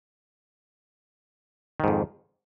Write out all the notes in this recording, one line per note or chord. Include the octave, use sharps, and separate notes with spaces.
F2 G#2 D#3